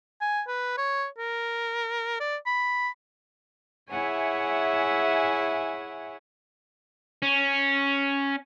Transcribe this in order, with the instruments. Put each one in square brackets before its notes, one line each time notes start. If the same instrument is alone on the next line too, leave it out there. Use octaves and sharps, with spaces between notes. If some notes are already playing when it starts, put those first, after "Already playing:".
[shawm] G#5
B4
C#5
A#4
D5
B5
[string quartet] E4 G#4 C#5 E5 F#5 G#5
[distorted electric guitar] C#4